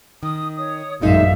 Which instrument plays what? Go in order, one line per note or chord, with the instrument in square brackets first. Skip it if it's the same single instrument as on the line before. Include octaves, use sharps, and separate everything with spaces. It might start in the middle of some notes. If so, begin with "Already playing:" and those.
[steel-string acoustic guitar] D#3 [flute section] D#6
[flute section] C#5 D#6
[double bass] A1 F#2 [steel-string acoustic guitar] A#2 G#3 D#4 [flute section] E5 F5